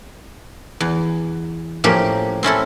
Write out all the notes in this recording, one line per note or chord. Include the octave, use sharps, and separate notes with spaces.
E2
A2 F3 A#3 C#4 G4
C4 C#4 E4 A4